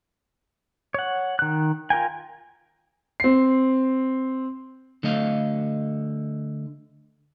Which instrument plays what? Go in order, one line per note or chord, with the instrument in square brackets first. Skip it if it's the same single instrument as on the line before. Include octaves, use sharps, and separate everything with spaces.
[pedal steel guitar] C#5 F#5
D#3 F#6
F4 A#4 G5 G#5
[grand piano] C4 C7
[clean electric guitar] D3 A3 D#5 F5